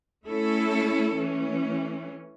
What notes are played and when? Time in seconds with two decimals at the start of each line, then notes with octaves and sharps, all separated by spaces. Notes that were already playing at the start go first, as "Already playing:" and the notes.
0.24 A3 C#4 E4 A4
1.16 E3 A3 C#4